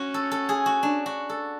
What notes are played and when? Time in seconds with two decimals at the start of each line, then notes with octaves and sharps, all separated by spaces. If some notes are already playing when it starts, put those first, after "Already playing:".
Already playing: C#4 F#4
0.14 A4
0.31 A4
0.49 G#4
0.66 F#4
0.83 D4
1.06 F#4
1.30 A4